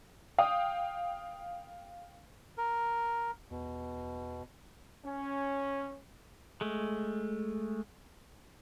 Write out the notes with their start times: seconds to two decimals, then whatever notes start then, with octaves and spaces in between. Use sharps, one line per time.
0.38 F5 G5 D#6
2.58 A#4
3.51 E2 B2
5.05 C#4
6.61 G#3 A3